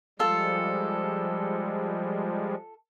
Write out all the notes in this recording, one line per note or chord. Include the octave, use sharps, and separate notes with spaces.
F3 G3 G#3 F4 A4